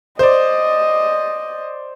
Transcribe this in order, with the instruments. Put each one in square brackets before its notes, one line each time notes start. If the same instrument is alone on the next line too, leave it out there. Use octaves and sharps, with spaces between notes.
[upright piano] C5 D5 [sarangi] D#5